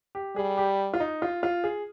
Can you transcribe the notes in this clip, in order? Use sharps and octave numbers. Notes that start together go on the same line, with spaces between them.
G4
G3 G#4
G4
F4
D#4
F4
F4
G#4